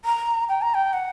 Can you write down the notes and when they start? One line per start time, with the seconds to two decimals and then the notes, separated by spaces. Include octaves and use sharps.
0.05 A#5
0.49 G5
0.62 A#5
0.74 G5
0.93 F#5